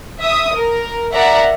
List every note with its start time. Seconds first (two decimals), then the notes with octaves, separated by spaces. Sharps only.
0.20 E5 D#6
0.55 A#4
1.13 A#4 D5 E5 F#5 A#5